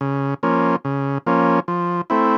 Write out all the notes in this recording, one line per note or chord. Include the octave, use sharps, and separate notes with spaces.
C#3
F3 A#3 C#4
C#3
F3 A#3 C#4
F3
A3 C4 E4